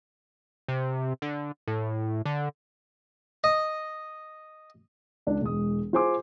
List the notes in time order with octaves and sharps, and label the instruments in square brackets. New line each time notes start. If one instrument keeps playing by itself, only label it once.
[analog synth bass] C3
D3
A2
D3
[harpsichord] D#5
[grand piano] C#2 D4
E1 G#3 D#6
F4 G#4 C5 G#5 C6 D6